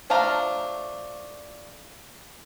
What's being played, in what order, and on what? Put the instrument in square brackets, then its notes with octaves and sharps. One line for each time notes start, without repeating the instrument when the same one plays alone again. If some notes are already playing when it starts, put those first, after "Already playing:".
[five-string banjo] F3 A3 D4 F5 A#5